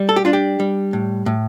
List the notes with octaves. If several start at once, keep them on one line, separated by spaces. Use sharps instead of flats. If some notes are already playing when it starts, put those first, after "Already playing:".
Already playing: G3
A4
G4
D4 F4
G4
G3
A2
A2